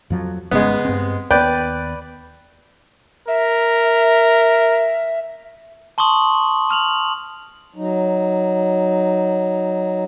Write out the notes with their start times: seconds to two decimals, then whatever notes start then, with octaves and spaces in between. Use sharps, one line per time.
0.10 F2 F3 F#3
0.51 G#1 G#2 C#3 G#3 B3
0.85 G2 C4
1.31 D#2 B3 B4 D5 G5
3.28 A#4 E5
5.98 A5 C6 C#6 D#6 F#7
6.69 A5 F6 F7 F#7
7.76 F#3 D#4